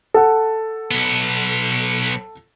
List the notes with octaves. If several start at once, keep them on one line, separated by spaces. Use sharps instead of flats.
A4 F#5
B1 B3